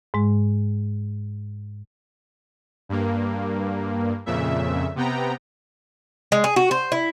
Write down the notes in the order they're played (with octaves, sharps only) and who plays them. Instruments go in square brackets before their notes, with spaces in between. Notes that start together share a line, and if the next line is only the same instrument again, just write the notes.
[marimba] G#2 G#3
[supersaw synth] G2 A#3
F2 A#2 C#3 E5
C3 B3 G5 A#5
[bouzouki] G#3
G#4
F#4
C5
E4